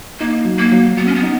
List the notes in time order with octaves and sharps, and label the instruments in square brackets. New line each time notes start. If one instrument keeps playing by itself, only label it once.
[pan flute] A#3 [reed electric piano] D#4
[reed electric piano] F#3
[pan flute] A#3
[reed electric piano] F#3
[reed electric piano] F#3 [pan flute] B3
[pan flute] C#4
B3
[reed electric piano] D#4